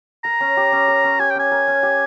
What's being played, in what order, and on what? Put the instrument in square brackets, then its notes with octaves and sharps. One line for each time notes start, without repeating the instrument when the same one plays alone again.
[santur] A#4 [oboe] A#5
[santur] C#4
G4
C#4
A#4
C#4
[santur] G4 [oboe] G#5
[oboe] G5
[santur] C#4 [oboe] G#5
[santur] A#4
C#4
G4